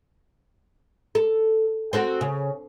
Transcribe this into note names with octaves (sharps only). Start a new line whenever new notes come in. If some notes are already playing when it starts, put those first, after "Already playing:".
A4
C4 F#4 A4
C#3